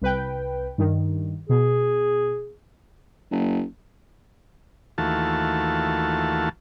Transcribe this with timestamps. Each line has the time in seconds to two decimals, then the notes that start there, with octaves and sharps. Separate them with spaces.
0.01 C2 B4 G5
0.78 G2 D#3
1.49 B2 G#4
3.31 F#1
4.98 D#2 E3 A3 F4 F#4 A5